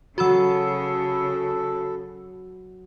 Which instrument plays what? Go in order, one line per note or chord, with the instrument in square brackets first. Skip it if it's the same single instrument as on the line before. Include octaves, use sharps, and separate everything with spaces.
[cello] C#3 [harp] F#3 D#7 [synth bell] F#4 B5 E6 [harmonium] A4